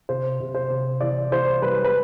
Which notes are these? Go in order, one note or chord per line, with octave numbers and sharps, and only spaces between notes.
C3 C5
C3
C5
C3
E3 D5
E3 C5
G3 B4
B4